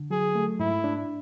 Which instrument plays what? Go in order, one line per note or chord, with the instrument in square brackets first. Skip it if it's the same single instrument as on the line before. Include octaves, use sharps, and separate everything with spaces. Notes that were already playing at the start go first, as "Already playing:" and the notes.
Already playing: [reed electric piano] D3
[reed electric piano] F#3 [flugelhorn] G#4
[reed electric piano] A3
[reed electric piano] G#2 [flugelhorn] E4
[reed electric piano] D4